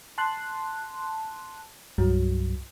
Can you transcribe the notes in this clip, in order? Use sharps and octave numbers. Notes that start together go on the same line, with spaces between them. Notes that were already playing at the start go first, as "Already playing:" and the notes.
A5 C6 F#6
C2 G2 F#3